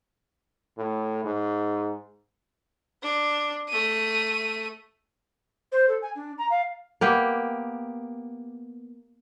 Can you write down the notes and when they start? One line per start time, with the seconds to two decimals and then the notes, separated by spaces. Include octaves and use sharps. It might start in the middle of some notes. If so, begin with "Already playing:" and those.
0.78 A2
1.24 G#2
3.03 D4
3.68 A3 D#7
5.72 C5
5.88 A4
6.01 G#5
6.15 D4
6.37 A#5
6.50 F5
7.01 A#3 B3 G4